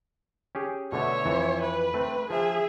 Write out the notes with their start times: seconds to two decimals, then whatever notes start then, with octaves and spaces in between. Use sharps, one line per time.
0.55 C#4 G4 G#4
0.92 B2 D3 A3 C#5 E5
1.25 F2 E3
1.62 B4
1.94 A3 C4
2.30 F3 G#4 E5